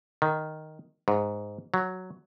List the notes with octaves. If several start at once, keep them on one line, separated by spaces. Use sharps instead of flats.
D#3
G#2
F#3